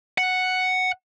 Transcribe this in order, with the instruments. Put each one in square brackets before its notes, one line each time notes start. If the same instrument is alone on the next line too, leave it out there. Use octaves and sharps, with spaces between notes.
[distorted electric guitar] F#5